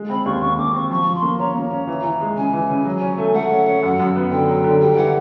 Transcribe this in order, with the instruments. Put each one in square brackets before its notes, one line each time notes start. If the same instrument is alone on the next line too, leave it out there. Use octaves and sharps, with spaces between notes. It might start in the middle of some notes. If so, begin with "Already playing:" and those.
Already playing: [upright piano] G#3
[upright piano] C4 [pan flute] B5
[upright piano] D#2 [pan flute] C#6
[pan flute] C6
[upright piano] D#2 [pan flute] C#6
[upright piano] D#2 [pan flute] D6
[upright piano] C4 [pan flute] C#6
[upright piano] F3 [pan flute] C#6
[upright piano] F3
[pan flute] C6
[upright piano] A#3
[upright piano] C#4 [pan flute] A#5
[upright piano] A#3
C#4
E3
E3
G#3
[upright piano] C#3 [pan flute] G#5
[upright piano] E3
C#3
F#3
C#4
A3
[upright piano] A3 [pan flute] F#5
[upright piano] C#4
C#4
F#2
F#2
B3
[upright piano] D3 [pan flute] G5
[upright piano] F#3
D3
[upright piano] G3 [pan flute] G5
[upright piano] E3 [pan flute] F#5